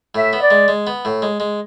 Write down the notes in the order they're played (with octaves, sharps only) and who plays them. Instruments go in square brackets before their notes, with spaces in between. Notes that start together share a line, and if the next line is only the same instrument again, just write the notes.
[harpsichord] A2 [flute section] E5
[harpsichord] B3
[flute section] D5
[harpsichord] G#3
G#3
B3
A2
G#3
G#3